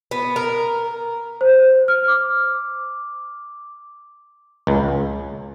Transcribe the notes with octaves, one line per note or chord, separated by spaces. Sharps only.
B3
A#4
C5
F6
D6
C#2